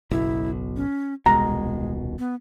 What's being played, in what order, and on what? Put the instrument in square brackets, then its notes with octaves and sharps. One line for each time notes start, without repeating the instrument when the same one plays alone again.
[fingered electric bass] F#1 B1 B2 [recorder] E4
[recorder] C#4
[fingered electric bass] D#1 C2 B2 [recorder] G#3 [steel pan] A#5
[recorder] B3